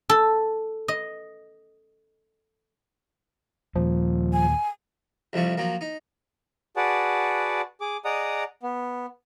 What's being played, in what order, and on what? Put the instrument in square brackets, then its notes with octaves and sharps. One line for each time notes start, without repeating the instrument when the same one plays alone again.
[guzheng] A4
D#5
[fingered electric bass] D#2 A#2 [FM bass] F3
[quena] G#5
[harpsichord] C2 F2 F3 G3 A3
F3 F#3 A#3
D#4
[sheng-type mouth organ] F#4 G#4 B4 D5 F#5 A5
G#4 D6
G#4 D5 D#5 F#5 A#5 D#6
B3